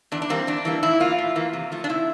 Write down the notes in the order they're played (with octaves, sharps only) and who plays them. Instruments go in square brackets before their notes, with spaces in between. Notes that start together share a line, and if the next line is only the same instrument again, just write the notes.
[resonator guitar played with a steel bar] E2 D4
D4
E3 G3 A#3 C4
E2 D4
E3 G3 A#3
A2 E4
E3 A#3 F4
A2
E3 A#3
C3
F3 A3
D4
C3 E4